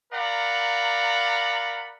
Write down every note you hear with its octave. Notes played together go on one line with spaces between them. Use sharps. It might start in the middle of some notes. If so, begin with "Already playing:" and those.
A#4 D5 F5 F#5 A#5 B5